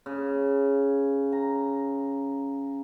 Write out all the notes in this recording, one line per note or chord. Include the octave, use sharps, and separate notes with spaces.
C#3
A#5